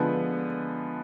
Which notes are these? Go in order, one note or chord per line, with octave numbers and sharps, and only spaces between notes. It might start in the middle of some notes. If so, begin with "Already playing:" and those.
Already playing: D3 F3 G#3 B3 B4